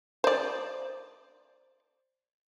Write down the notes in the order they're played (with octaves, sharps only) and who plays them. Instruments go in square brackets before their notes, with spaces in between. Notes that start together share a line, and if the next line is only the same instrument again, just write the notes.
[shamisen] C5 D5